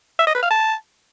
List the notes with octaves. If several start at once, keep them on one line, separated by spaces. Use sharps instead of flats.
E5
D#5
B4
F5
A5